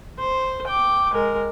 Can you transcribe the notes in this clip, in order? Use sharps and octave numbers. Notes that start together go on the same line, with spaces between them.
C5
G5 D6
G#3 A#4